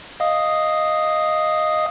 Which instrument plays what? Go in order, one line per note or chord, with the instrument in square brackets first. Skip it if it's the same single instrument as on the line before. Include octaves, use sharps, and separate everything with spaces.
[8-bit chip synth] D#5 F5 D#6